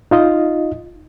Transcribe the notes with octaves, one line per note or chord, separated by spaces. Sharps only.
D#4 F4 D#5